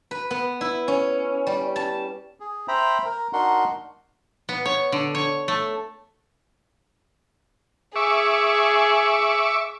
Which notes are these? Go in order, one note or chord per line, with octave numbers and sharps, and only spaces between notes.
B4
B3
E4
C#4
G3
A5
G#4
C5 E5 G5 A#5 B5
A#4
D4 D#4 F#4 A#4 F#5 C6
B3
C#5
D3
C#5
A3
G#4 E5 C#6 D6